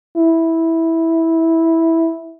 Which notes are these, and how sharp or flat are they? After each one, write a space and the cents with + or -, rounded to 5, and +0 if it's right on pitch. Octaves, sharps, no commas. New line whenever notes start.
E4 -10